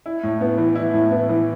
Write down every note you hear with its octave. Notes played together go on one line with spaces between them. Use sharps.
E4
A2
B3
E3
E4
A2
B3
E3